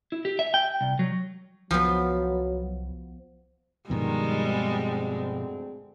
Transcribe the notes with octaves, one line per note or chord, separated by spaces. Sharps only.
E4
G4
E5
G5
C2
F#3
C2 F3 F#3 B3
G2 B2 D#3 F3 G3 G#3
D2 C4 G#4